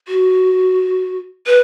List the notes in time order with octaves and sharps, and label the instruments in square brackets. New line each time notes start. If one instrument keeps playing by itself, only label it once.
[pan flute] F#4
B4